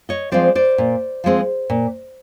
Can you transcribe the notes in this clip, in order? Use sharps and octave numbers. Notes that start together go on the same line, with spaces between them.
C#5 D#5
F3 G#3 C4 C5 D5
C5 D5
A#2
F3 G#3 C4
A#2